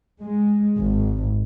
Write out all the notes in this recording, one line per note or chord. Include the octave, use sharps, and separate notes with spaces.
G#3
G#1